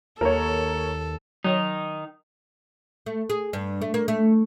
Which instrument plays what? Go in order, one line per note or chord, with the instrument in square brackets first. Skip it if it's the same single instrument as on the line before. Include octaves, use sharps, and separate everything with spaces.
[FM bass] D#2 [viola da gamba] A4 [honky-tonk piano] A#4 C#5
[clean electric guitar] D#3 D#4 [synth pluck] F#3
[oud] A3
G#4
G2
A3
A#3
A3